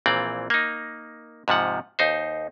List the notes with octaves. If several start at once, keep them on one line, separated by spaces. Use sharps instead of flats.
A#1 A#2 E3 C4 D5
A#3 D#4
G#2 C3 F3 F#5
D#2 D#4 C5